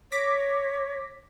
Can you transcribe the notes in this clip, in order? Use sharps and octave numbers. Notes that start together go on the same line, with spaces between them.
C#5 D6 A#6 B6